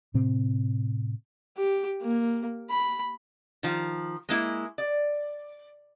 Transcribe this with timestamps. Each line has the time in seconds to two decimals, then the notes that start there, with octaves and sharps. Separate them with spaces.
0.14 A2 C3 C4
1.57 G4
2.02 A#3
2.70 B5
3.63 D#3 F3
4.29 G#3 A#3 E4
4.78 D5